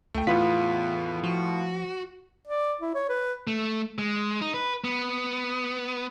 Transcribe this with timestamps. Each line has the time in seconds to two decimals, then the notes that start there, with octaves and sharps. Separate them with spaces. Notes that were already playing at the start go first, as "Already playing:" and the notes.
0.14 C#2 A3 G5
0.27 E2 A2 B3 F4 B4 B6
1.24 F3 F#4
2.47 D5
2.81 E4
2.95 C#5
3.09 B4
3.47 A3
3.98 G#3
4.41 D#4
4.54 B4
4.84 B3